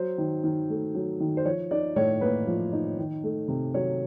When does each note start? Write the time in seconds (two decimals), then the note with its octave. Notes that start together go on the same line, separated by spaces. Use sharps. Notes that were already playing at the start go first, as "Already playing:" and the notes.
Already playing: F#3 C5
0.18 D#3
0.44 D#3
0.70 A3
0.95 F#3
1.20 D#3
1.37 C5
1.45 F3 C#5
1.71 D#4 D5
1.96 A2 C#5
2.21 A#3 B4
2.47 F3
2.72 D#4
2.98 D#3
3.24 A3
3.48 C3
3.74 F#3 C#5